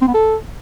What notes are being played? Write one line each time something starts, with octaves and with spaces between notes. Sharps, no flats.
C4
B3
A4